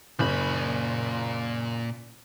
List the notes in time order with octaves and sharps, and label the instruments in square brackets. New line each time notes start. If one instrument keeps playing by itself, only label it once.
[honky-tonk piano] F#1 [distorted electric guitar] A#2 B5